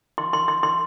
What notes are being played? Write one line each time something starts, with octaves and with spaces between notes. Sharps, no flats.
C6
C6
C6
C6